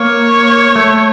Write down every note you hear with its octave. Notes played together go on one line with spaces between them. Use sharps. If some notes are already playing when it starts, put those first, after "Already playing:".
Already playing: A#3 C#5
A3